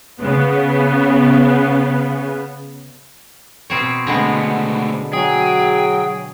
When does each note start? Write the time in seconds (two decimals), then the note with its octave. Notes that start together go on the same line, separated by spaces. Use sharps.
0.21 C#3 B3
3.70 B2 C4 C#5
4.07 D3 G#3 A3 B3 C4
5.13 F#3 G#4 G5